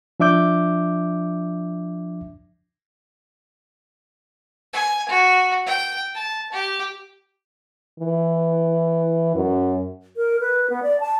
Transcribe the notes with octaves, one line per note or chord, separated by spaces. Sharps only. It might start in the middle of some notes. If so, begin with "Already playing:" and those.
F3 D4 E5 D6 G6
G#5
F#4
G5
A5
G4
E3
F#2
A#4
B4
B3
D5
A5